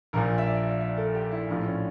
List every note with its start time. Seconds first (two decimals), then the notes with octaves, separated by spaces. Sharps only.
0.13 A#1 A#2 F3 A#4
0.38 E5
0.47 D5
0.64 E5
0.81 E5
0.97 A4
1.15 G4
1.32 E4
1.48 A#1 A2 F3 D4
1.66 C#4